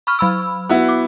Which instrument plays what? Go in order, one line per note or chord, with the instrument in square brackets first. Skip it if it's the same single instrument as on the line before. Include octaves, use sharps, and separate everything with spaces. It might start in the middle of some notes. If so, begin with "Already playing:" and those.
[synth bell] B5 C#6 F6
F#3 B5 E6
[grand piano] B3 E4 F#4
[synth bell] D6